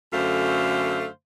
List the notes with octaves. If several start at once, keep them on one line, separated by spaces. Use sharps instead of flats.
F#2 D3 A3 C5 F5